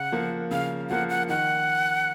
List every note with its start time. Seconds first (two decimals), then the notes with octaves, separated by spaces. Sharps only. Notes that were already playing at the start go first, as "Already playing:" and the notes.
Already playing: C#3 F#5
0.12 F3 A#3
0.51 C#3 F5
0.90 F3 A#3 F#5
1.09 F#5
1.29 D#3 F#5